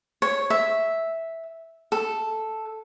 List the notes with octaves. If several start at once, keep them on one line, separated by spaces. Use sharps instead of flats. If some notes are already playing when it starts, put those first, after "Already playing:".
C#5
E5
A4